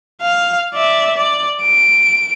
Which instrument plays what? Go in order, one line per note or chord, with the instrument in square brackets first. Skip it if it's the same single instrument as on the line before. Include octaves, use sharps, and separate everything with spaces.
[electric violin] F5
D5 E5
D5
D7